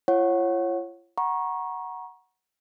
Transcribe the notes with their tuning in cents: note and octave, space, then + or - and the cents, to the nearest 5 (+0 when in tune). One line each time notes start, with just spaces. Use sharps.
F4 -40 C#5 -15 F#5 +0
F#5 +0 A#5 +30 C#6 -15